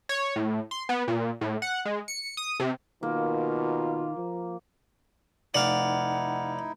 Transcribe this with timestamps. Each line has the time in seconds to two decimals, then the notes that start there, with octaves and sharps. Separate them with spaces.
0.09 C#5
0.36 A2
0.71 C6
0.89 B3
1.08 A#2
1.41 A2
1.62 F#5
1.85 G#3
2.08 C#7
2.37 D#6
2.60 C3
3.03 B2 D#3 A#3 F4
4.17 F3
5.55 F1 D#4 E4 D5 F5 F#5